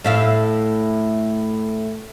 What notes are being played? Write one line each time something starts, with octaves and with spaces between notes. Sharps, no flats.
A2 E5 F5